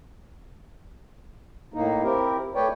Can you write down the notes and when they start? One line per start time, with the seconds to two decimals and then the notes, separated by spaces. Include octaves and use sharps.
1.74 A2 A#3 D#4
2.03 C4 E4 G4 A#4
2.55 A3 B4 C#5 D5 G5